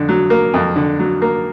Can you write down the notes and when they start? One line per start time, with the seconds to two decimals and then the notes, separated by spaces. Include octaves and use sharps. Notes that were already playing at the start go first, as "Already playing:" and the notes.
Already playing: F2 D3
0.09 F#3
0.30 A#3
0.54 F2
0.76 D3
0.99 F#3
1.22 A#3